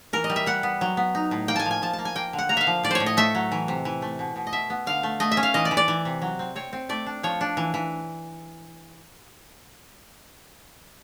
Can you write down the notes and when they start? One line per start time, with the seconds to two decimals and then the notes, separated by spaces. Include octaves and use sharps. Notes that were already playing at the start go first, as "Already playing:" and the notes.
0.13 E3 A#4
0.24 D#5
0.30 G3
0.36 E5
0.46 G3 F#5
0.63 B3
0.81 F#3
0.97 B3
1.15 D#4
1.31 A2
1.48 A#3 G5
1.56 G#5 A5
1.66 F3
1.71 G#5
1.82 F3 A5
1.93 A5
1.98 A#3
2.05 G#5
2.16 A#3 G5
2.33 D3
2.39 F#5
2.49 A#3 A#5
2.57 E5 F5
2.67 F3
2.84 A2 D5
2.91 C5 C#5
3.00 A2
3.06 D#5
3.17 A3 E5
3.35 F#3
3.52 E3
3.68 C3
3.85 E3
4.02 A3
4.19 B2
4.36 B2
4.47 D#5
4.52 B2 E5
4.70 B3
4.87 D3 F5
5.03 A3
5.20 A3 D#5
5.31 E5
5.37 C#4
5.43 F5
5.54 E3 D#5
5.65 D5
5.71 E3
5.77 D5
5.88 E3
6.05 C3
6.22 F#3
6.39 C4
6.56 C4 C#5
6.73 C4
6.89 A3 D5
7.06 D4
7.23 F3 C#5
7.41 D4
7.57 E3
7.74 E3